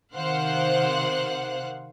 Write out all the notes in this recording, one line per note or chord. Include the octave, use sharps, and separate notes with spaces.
C3 D#3 C5 F5 F#5 F#6